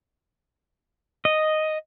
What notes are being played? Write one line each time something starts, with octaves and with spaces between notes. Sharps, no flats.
D#5